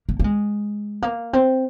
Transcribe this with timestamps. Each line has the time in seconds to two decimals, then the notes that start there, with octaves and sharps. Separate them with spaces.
0.09 A#3
0.20 A#3
0.24 G#3
1.02 A#3
1.33 C4